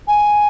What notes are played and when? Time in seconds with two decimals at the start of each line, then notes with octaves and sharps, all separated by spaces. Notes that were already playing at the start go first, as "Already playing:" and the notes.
0.08 G#5